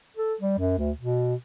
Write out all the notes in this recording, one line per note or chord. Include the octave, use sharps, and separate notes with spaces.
A4
G3
F#2
D2
B2